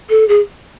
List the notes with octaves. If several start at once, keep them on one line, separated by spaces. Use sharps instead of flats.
A4
G#4